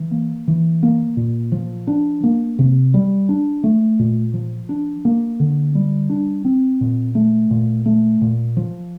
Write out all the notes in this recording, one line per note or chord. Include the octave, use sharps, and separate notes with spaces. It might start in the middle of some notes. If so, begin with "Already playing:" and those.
Already playing: E3
A#3
E3
A#3
A#2
F3
D4
A#3
C3
G3
D4
A3
A#2
F3
D4
A#3
D3
G3
D4
C4
A#2
A3
A#2
A3
A#2
F3